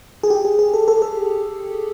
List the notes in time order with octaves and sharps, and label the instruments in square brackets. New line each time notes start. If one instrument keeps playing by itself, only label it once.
[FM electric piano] G#4
G4
G#4
G#4
A4
A4
A4